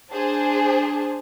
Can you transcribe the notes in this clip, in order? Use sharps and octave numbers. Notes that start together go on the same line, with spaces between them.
D4 G#4 C5 A5